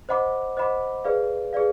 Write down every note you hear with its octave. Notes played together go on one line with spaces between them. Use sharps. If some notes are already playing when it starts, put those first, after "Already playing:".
C5 D#5 F#5 B5 D6
C5 D#5 F#5 B5 D6
G#4 B4 D5 F5
G#4 B4 D5 F5